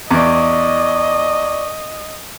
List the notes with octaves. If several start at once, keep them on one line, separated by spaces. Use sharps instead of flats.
E2 D5 D#5 C#6 D6